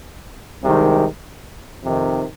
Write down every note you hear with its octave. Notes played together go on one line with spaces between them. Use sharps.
C2 C3 D#3 G#3
F2 C3 D#3